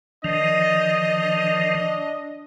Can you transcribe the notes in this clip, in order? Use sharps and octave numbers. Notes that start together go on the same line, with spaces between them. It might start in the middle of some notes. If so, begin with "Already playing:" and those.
D#3 F3 D4 D#5